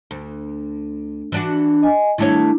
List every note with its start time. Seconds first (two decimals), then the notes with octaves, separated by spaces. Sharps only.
0.11 D2
1.32 E3 D4 F#4
1.83 D#5 G#5
2.18 D#3 A3 D4 E4 C#5